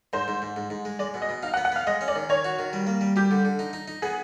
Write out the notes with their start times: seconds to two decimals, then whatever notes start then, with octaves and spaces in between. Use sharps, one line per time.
0.13 G#2 C5
0.28 G#2
0.42 G#2
0.56 G#2
0.70 G#2
0.85 G#3
0.99 G#3 D5
1.14 B2
1.22 D#5
1.29 B2
1.43 D#4 F5
1.54 F#5
1.57 B3
1.65 F#5
1.72 B3 F5
1.87 G#3 D#5
2.01 C#4
2.08 D5
2.15 D#3
2.29 D#3 C#5
2.45 F#4
2.59 D#3
2.73 G3
2.87 A#3
3.01 G3
3.16 G3 G4
3.31 D3
3.45 D3
3.59 D#4
3.73 D#4
3.88 D#4
4.02 B3 G#4